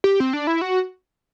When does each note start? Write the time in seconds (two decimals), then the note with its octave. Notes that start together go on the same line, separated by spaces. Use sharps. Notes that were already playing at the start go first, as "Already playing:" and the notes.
0.04 G4
0.20 C4
0.33 D4
0.47 E4
0.61 F#4